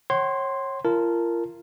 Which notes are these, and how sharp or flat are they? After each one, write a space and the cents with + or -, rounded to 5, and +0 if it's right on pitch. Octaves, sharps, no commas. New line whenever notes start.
C#5 -30 F#5 +45 C6 +0
F4 -35 A#4 -10 A5 -15